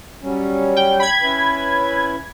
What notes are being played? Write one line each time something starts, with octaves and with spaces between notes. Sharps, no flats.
F#3 G3 C#4
G5
B5 G#6
C#4 E4 B4